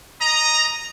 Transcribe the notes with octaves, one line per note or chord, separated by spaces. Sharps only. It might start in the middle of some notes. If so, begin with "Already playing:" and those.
D#5 A#5